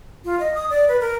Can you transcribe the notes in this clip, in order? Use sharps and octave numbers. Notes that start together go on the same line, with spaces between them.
F4
D#5
D#6
D5
B4
A#4